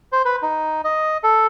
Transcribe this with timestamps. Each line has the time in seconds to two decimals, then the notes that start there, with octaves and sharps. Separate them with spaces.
0.12 C5
0.25 B4
0.42 D#4
0.84 D#5
1.23 A4